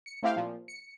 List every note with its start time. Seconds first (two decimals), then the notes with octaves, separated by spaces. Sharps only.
0.06 C#7
0.23 A3 C4 E4 G4 F5 G5
0.36 A#2 F3
0.68 C#7